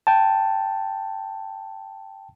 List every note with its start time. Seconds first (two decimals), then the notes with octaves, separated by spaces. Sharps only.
0.07 G5 A5